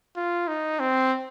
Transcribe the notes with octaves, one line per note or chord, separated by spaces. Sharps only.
F4
D#4
C4